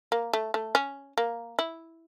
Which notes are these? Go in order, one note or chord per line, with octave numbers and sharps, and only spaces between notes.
A#3
A3
A3
C#4
A#3
E4